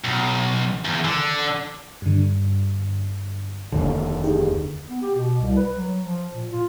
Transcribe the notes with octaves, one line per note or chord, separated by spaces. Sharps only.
B1
E2
D3
G2 D3
F1 D#2 D3
D#4 G4 G#4
B3
G4
B2
C2
B4
F#3
F3
A#2
F4